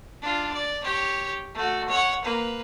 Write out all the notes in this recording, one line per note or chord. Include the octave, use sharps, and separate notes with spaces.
D4 F4
D5
G4 C#5
A3 F#4
C#5 F#5
A#3 B4